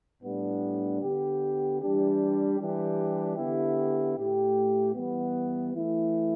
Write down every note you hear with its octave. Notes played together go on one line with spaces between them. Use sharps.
A2 G3 B3 D4
D3 B3 G4
E3 G3 D4 G4
E3 G3 D4 G4
D3 B3 E4 G4
A2 A3 G4
E3 G3 B3
E3 A3 E4